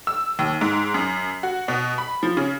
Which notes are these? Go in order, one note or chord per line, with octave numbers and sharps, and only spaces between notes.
E6
D#2
G#2
F#2
F#4
B2
B5
F3
C#3